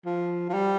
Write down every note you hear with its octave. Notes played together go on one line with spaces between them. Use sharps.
F3
F3
G3